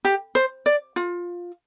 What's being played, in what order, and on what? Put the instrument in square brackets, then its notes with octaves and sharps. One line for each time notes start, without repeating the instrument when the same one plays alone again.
[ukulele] G4
C5
D5
F4